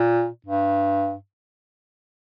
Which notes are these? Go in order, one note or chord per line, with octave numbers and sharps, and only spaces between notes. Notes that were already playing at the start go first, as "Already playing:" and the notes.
Already playing: A#2
G2